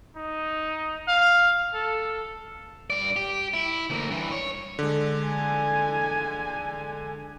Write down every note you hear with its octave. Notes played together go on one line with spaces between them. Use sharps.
D#4
F5
A4
G2 D5
G4
E4
D2 A#3
G2 E3
C#5
D3 G#3
G#5